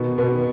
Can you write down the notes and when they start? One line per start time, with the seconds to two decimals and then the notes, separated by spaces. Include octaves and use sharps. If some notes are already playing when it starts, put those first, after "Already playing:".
Already playing: B2 D#3 B3
0.18 B2 B3
0.32 D#3